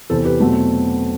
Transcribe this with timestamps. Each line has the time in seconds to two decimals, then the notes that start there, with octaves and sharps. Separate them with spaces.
0.10 E2 C3 E3 A4 C5
0.25 G4 B4
0.40 E2 B2 F#3 A3 C4